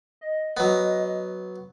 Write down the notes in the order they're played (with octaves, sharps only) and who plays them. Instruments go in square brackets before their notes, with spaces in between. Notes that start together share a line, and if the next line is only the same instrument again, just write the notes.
[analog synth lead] D#5
[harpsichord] F#3 B3